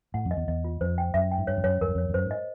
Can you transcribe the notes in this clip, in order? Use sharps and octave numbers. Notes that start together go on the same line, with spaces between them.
A2 F#5
F2
D#5
E2
E2 D#5
F4
F2 C5
G5
F#2 E5
G5
G#2
G2 C#5
F2
F#2 C#5
F2 A#4
F#2
F2 C#5
F2
F#2 C5
G#2
D#5